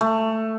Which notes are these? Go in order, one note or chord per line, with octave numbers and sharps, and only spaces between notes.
A3